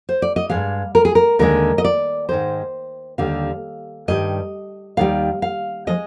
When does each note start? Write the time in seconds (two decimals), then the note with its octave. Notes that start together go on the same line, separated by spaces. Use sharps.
0.09 C5
0.22 D5
0.36 D#5
0.49 G2 F3 G#3 F5
0.95 A#4
1.05 G#4
1.15 A#4
1.39 D#2 D3 G#3 A#4
1.78 D#5
1.84 D5
2.29 G#2 D#3 G#3 C5
3.18 D#2 D3 G3 F5
4.08 G2 D#3 G3 D#5
4.97 D#2 D#3 G3 F5
5.42 F5
5.87 F3 G#3 D#5